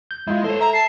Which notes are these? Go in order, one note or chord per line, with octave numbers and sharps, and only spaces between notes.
G6
G#3 E4 F4
A4 C5 C#5
E5 A#5
A5 C7